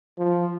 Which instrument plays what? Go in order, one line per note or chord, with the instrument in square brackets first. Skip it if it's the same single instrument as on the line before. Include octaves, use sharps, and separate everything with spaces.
[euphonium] F3